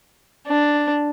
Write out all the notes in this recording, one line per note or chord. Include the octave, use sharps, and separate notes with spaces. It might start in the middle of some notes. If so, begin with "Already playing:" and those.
D4